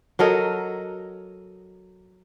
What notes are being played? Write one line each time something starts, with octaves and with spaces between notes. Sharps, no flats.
F#3 A4 A#4 D#5